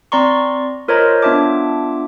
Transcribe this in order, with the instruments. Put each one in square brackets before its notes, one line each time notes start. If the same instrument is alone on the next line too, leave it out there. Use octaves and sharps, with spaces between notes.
[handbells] C4 D5 A#5 C6 C#6
F4 A#4 C5 C#5 D#5 A#5
B3 D4 F4 E5 A5 D6